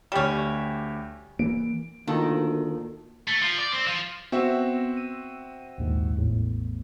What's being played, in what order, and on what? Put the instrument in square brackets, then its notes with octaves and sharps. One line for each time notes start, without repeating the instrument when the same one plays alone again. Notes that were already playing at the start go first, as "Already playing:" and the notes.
[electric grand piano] D2 G4 E7 [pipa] G3 C#4
[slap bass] E3 A#3 [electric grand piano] D7
[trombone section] D2 [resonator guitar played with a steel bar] D#3 [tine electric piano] A#3 F4 A4
[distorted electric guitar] A3
F3
D5
C4
F3
[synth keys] B3 C5 [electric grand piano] C4 F#4 E5
[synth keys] D#7
A#1 D#2 G#2
A1 E2 A2